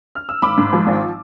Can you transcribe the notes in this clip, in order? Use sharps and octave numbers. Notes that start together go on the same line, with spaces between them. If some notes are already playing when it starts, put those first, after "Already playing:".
F6
E6
G#1 B5 D6
G#2
F3
G#1